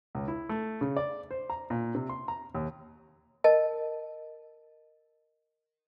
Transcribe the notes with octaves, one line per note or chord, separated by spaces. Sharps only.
C#2
E4
A3
C#3
D5
C5
A#5
A#2
C3
C6
A#5
D#2
A#4 D#5 A5